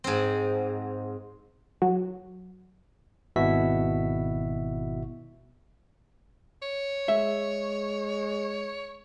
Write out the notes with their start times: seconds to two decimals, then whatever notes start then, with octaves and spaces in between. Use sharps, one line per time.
0.04 G#2 C4
1.82 F#3
3.36 G#1 B2 E4 F#4 E5 B6
6.62 C#5
7.08 G#3 E5